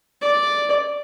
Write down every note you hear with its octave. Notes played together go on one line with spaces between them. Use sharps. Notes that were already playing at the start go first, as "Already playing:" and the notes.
D5